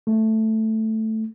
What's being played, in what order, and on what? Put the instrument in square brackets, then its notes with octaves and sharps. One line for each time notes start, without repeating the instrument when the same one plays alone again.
[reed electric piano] A3